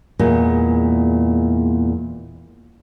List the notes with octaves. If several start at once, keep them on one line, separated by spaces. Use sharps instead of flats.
E2 A#2 G#3